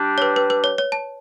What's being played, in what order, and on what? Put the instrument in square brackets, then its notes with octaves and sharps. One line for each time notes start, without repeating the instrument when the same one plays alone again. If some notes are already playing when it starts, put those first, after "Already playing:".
Already playing: [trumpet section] G3 D4 G4
[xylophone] C#5
B4
B4
B4
C#5
C#5
A5